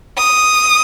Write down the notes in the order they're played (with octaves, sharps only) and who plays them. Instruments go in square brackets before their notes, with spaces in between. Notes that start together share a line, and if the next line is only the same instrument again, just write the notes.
[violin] D#6